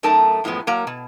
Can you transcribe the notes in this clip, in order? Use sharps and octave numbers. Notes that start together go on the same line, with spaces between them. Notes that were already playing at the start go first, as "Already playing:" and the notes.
F#2 A3 D#4 A#4 A5
F#2 A2 F3 G#3 B3
F#3 A#3 A#4 A#5
B2